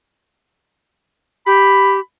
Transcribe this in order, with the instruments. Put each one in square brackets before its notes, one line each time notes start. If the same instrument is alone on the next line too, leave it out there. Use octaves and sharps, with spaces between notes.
[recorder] G4 [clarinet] B5